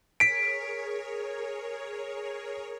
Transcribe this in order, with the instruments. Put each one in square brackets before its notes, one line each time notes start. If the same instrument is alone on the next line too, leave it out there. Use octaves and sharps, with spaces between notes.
[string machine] G#4 A#4 C#5 [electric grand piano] B6 D7